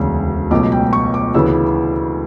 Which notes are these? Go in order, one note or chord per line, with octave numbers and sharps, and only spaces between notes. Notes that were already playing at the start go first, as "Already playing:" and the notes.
Already playing: E1 D2 C#3
C#2 B2 F#3 A3 D6
G5
C#6
D6
D2 C#3 E3 B3 E6